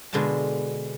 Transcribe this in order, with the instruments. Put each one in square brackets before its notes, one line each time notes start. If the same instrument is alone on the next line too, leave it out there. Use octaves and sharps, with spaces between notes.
[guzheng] B2 D3 G#3 F4 A5